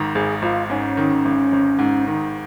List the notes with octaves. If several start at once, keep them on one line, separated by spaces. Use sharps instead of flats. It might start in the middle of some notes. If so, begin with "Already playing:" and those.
Already playing: G#1 G#2 D#3
G#1 G#4
G#1 F4
G#2 C#4
D#3
G#1
G#1
G#2
D#3